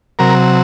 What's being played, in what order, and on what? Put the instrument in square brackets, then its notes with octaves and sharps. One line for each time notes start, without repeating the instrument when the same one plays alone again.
[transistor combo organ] C3 F#3 A#4